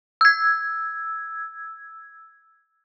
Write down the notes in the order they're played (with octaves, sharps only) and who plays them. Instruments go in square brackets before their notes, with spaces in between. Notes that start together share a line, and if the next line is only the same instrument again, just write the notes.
[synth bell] E6 G#6